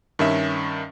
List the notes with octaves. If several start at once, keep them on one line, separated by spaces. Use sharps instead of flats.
G2 D#3 C#4 E5